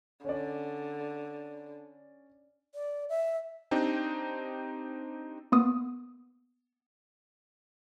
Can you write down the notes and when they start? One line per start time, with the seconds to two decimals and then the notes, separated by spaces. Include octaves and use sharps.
0.25 D3 C#4 D5
2.75 D5
3.09 E5
3.71 C4 D4 D#4 G4
5.52 A#3 B3 D#6